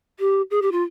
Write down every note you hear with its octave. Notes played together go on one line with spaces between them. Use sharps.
G4
G#4
G4
F4